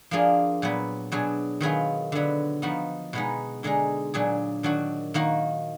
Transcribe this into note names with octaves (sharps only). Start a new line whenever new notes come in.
F3 A#3 D4 F4 G#4
A#2 F#3 B3
B2 F#3 D4 G#4
D#3 F#3 B3 F4 G#4
D3 F#3 B3
F3 B3 D#4 F#4
B2 G#3 B3 D#4
D3 G#3 D#4 G#4
A#2 F#3 D4 G#4
D#3 F#3 D4 F#4
D#3 A#3 D#4 F#4